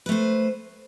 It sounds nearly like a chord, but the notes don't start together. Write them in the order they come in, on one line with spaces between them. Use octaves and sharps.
B4 A3 C5